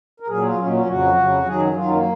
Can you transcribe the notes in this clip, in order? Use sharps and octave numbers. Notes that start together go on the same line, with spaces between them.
A#4
A#2 F#3 G#4
F4
A#2 F#3 C#4
D#4
C#4
F2 C#3 F#3 F#4
F2 C#3 F#3
F#2 D#3 F#3 G#4
F#2 D#3 F#3 F4
A#3